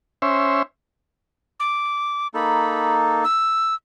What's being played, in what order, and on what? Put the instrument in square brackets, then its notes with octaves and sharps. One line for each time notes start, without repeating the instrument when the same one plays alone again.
[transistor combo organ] C#4 C5 E5
[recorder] D6
[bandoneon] A#3 D#4 A4 [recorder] B5
[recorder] E6